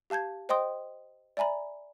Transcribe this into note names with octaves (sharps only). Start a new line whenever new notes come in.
G4 F5 A5 G6 G#6
C5 D#5 G5 C6 D#6
D5 E5 G#5 A#5 B5